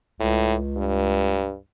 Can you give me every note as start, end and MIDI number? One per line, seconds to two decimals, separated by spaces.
0.20 1.59 37
0.20 0.54 45
0.77 1.56 43